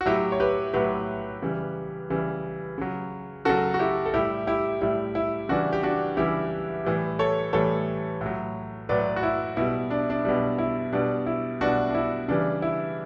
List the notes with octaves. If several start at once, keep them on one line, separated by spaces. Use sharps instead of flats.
F#4
A2 F#3 E4 G4
C#5
G4 B4
A2 F#3 G4 B4
C#3 E3 G3
C#3 E3 G3
C#3 F#3
C#3 F#3 F#4 A4
F#4
E4 G4
A4
A2 G3 E4 G4
E4 G4
A2 G3 E4
E4
C#3 E3 G3 D4 F#4
G4
D4 F#4
C#3 E3 G3 E4 G4
A2 E3 G3
A4 C#5
A2 E3 G3 A4 C#5
A2 F#3
A2 F#3 B4 D5
F#4
E4
B2 G3 E4
D4
D4
B2 G3 D4
E4
B2 G3 D4
E4
B2 G3 D4 F#4
D4
E4
C#3 E3 G3 D4
E4